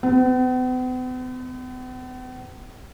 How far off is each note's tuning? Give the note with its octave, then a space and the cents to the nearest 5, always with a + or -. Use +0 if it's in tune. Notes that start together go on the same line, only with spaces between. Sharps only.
B3 +45